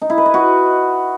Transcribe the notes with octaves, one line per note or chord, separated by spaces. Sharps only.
D#4
E4
B4
D#5
F#4